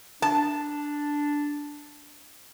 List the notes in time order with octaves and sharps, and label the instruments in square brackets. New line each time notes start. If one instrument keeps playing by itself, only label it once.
[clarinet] D4 [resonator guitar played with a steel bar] A5